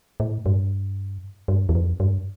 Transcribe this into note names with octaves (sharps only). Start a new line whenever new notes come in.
A2
G2
G2
E2
F2
G2